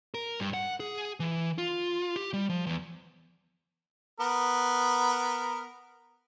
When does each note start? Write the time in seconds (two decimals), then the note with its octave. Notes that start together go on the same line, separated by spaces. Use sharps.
0.14 A#4
0.40 G2
0.54 F#5
0.80 G#4
1.20 E3
1.58 F4
2.16 G4
2.33 G3
2.50 F3
2.67 E2
4.20 B3 A#4